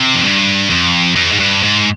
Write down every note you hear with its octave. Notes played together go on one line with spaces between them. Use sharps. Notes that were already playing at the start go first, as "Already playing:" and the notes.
Already playing: C3
F2
G2
F2
F2
G#2
G2
G#2